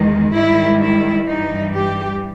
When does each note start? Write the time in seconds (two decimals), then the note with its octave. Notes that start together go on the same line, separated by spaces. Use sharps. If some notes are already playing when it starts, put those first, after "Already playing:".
Already playing: E2 D#3 G#3
0.31 G#2 D#3 G3 E4
0.79 E4
1.27 G2 E3 G3 D#4
1.74 G4